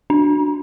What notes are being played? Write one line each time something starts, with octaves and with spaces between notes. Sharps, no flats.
D4